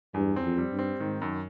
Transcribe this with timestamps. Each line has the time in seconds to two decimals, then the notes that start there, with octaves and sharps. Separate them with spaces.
0.14 E2 G2
0.36 C4
0.43 F2
0.58 G3
0.72 G2
0.79 C4
1.00 G#2 D#3
1.22 F#2